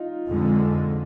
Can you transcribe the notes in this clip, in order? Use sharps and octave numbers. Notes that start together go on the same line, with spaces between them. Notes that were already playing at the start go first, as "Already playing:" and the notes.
Already playing: D#4 F4
F2 D3 G#3